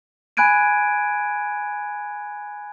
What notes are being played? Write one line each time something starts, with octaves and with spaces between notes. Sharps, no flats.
G#5 B5 F#6 G#6 D7 D#7